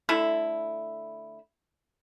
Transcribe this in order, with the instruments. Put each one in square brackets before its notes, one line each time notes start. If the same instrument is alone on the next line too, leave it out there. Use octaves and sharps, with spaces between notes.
[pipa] D3 A3 E4